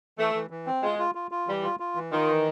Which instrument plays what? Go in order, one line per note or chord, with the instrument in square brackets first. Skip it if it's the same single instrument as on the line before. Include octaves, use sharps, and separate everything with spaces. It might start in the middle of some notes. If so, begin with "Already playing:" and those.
[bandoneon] E3 [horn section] A3
[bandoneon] E3
E3
C4
[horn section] G#3 [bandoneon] F4
[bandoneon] F4
F4
F4
[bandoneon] E3 [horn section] G3
[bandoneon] F4
F4
E3
[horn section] D#3 [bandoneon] F4
[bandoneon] E3